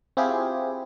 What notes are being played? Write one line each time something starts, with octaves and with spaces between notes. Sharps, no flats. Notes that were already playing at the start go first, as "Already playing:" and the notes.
C4 E4 F4 G4 G#4